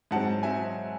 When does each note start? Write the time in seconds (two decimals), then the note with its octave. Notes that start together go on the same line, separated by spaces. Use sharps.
0.11 G#2 F#3 C4 F#5 A5
0.43 F#3 C4 E5 G#5